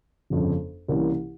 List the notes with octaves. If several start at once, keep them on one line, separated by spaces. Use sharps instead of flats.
G1 F2 C#3
C2 C3 E3 A#3 C#4